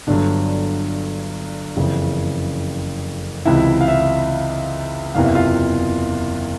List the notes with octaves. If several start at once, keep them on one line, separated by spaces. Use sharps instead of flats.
G1 G2 D3 F#3 D4 D5
F#1 F2 C#3 E3
C#2 C3 E3 E4 E5
F5
E4 E5
F#1 E2 C3 E3 F5
E5
F4 F5